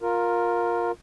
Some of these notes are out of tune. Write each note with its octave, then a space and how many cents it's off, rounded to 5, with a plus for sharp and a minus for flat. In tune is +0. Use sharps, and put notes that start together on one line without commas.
F4 +15 A#4 +0